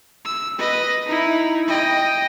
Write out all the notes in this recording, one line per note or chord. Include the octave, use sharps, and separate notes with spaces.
E6
B4 D#5
D#4 E4
D#5 G5